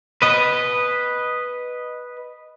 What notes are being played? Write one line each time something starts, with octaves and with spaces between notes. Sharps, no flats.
B4 D#5